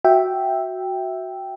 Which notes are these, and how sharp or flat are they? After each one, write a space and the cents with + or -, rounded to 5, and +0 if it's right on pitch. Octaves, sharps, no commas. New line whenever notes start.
F#4 +0 E5 +0 G5 +0